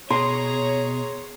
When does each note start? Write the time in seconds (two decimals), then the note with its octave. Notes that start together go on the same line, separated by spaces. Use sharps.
0.10 B2 G#4 C#5 A#5 C6